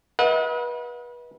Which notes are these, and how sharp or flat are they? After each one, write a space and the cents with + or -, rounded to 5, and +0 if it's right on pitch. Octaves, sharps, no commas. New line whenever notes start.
B4 -30 D#5 +40 F#5 -40